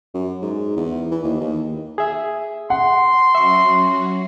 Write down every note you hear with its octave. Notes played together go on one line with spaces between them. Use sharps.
F#2
G#2
E2
E3
D#2
D#2
G#4 E5
F#5 C6
F#3 C#4 F#4 E5 C#6